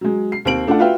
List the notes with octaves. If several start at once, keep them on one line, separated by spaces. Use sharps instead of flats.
F#3 G#3
C7
D#2 C4 D7 F#7
A3 D4 F4 A4 F#5
F4 F#4 B4 E5 F5 G5